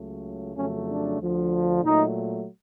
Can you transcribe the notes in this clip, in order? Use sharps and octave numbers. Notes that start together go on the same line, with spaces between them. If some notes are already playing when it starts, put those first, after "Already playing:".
Already playing: C#2 C#3 F#3 A3
F2 C#3 F#3 A3 C#4
D4
D2 D3 F3
A#2 F#3 A3 D#4